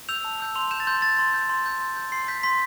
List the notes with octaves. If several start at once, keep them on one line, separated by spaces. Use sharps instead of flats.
E6 G6 F7
A5
E6 G6
C6 F7
G6 E7
A6
C6 G6
G6 A6
C6
G6
C6
G6
C6
G6
C6 C7
G6 B6
C6 B6